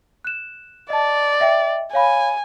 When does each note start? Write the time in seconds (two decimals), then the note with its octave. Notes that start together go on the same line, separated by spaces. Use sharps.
0.25 F#6 E7
0.90 D5 D#5 A5
1.40 D#5 E5 G5
1.93 C#5 F5 G#5 B5